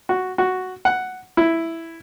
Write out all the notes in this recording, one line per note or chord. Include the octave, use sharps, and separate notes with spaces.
F#4
F#4
F#5
E4